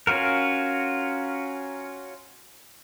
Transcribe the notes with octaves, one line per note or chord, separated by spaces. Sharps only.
C#4 F4 F#4 A#4